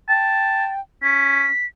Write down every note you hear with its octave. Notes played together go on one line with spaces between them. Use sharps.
G5 A5
C#4 B6